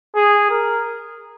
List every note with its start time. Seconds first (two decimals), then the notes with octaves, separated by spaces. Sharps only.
0.16 G#4
0.51 A#4